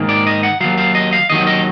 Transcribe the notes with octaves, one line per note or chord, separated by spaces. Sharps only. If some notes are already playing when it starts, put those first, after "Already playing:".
Already playing: G#2 D#3 A#3
D5
D#5
F#5
D#2 D#3 F#3 F5
F5
D#5
F5
D#2 D#3 F#3 D#5
D#5